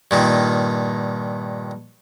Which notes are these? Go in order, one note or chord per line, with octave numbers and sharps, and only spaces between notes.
G2 A#2 D#3